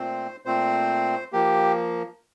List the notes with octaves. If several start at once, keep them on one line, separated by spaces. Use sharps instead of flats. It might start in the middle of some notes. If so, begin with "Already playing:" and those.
Already playing: A#2 A3 C4 C5
A#2 A3 C4 C5
F3 A#3 G4